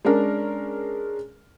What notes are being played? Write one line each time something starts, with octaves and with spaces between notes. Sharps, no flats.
G#3 C#4 D4 A#4